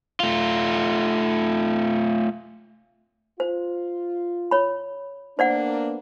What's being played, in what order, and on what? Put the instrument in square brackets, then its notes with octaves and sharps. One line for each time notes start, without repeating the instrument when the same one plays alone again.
[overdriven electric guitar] A3 F4
[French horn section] F4 [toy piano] C5
[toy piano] C#5 B5
[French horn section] A#3 B3 D4 [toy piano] C5 D5 F#5